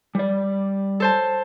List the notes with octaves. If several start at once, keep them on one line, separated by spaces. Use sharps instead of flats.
G3 D5
A4 C5 A5